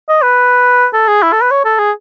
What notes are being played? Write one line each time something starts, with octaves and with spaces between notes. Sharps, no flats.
D#5
B4
A4
G#4
E4
A4
B4
C#5
A4
G#4